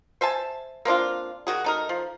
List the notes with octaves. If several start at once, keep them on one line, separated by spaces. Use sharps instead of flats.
C5 E5 G#5 A5
A#3 C4 D4 F4
D#3 F#4 G#4
A3 D#4 A#4
F3